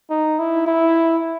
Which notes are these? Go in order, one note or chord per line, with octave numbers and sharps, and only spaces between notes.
D#4
E4
E4